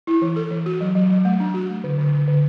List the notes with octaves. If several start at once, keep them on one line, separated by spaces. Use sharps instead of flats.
E4
E3
A4
E3
F#4
F#3
F#3
F#3
A3
D4
F#4
A3
D3
D3
D3
D3